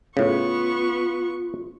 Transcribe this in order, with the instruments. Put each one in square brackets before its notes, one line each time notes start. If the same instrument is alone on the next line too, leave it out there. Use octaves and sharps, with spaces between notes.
[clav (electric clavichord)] A2 C#3 [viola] B3 C#6 [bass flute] F4